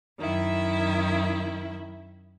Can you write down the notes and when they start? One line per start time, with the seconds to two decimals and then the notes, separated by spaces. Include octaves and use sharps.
0.18 F#2 D#3 E4 E5